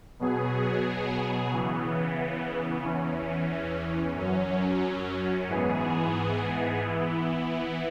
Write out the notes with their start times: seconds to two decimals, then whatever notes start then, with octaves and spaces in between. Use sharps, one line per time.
0.20 B2 F#3 B3 G#4
1.52 C#3 E3 B3
2.84 E2 E3 C#4
4.16 F#2 F#3 C#4
5.48 G#2 E3 B3 G#4
6.81 E3 B3 E4